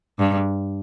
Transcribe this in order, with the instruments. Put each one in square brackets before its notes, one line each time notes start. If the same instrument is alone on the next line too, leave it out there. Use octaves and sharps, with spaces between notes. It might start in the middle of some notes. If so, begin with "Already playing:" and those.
[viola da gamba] G2